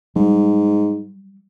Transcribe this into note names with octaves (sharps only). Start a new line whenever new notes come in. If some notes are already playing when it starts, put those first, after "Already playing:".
G#2 F#3 G3